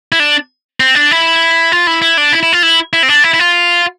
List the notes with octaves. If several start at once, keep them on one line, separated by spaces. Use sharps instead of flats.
E4
D4
C4
D4
E4
F4
E4
E4
D4
E4
E4
F4
E4
E4
C4
D4
E4
E4
F4